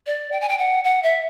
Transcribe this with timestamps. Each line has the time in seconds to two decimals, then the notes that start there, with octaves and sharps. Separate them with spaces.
0.07 D5
0.32 G5
0.41 G#5
0.49 G5
0.58 F#5
0.84 F#5
1.03 E5